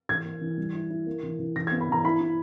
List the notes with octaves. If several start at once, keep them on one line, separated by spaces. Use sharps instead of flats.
E3 G#6
A#3
E3
G3
E4
E4
A#3
E3
E3
E3 A#6
B3 G#6
B5
E3 A#5
E4 B5
E4